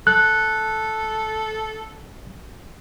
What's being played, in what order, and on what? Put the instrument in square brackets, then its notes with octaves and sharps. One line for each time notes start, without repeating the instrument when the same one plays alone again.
[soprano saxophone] A4 [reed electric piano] F#6